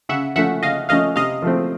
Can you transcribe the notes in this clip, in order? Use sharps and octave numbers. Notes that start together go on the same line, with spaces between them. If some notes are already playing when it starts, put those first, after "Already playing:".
C#3 E5 F#5
F3 A3 C#4 E5 F#5
C#3 D#5 F5
F3 A3 C#4 D#5 F5
C3 D#5 F5
F3 A3 C4